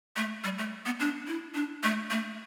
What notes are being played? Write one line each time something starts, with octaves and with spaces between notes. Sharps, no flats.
A3
G3
A3
B3
D4
E4
D4
A3
A3